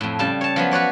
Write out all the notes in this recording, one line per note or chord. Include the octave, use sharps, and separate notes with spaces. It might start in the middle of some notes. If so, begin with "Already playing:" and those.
F2 A2
C#3 G3 A5
C#5 A5
F3 F#3 B3
F#4 B4 C#5 D5